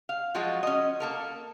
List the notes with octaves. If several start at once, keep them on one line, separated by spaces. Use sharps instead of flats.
F5
F3 F#3 G#3 F4 F#4
C#4 D#5
A#3 A4 A#4